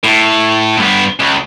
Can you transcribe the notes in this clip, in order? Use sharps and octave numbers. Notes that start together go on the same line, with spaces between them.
A2
G2 B3
C#2